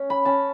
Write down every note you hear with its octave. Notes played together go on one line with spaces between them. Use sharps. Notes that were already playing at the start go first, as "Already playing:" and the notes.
Already playing: C#4
B5
C#4 A5